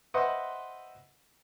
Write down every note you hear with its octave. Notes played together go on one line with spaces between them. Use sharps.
B4 C5 D#5 E5 F#5 C6